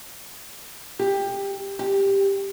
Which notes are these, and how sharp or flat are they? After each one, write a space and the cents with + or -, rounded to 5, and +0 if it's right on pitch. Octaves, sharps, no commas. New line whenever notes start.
G4 +15
G4 +5